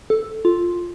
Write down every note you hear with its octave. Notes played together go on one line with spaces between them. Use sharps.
A4
F4